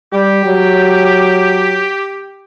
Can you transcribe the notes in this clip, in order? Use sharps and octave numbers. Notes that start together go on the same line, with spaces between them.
G3 G4
F#3